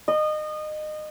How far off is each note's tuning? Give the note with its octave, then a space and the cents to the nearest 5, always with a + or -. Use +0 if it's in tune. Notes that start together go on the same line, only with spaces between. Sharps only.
D#5 -25